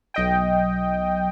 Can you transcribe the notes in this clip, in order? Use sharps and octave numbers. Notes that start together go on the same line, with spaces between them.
B1 D#5 G5